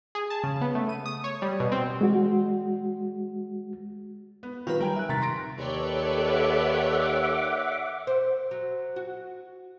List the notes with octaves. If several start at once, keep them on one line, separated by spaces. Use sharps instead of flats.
G#4
A5
C#3
B3
A3
D#7
D#6
C#5
G3
B2
C4
G#3 F#4
B3
D#3 F#3 G3 F4 F#4 B4
F#3 G3 A#4 G5 G#5
E5 F#6
C3 D#3 A#5 A6 B6
C6 A#6 D7
D#2 A4 B4 C#5 D5 G5
E5 F#5 D6
C5
F#3
F#4